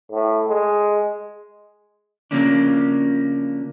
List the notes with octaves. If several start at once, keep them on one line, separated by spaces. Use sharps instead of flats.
A2
G#3
C#3 F3 A#3 C#4 D4